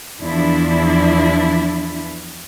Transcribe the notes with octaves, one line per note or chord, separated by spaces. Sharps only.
E2 F3 D4 E4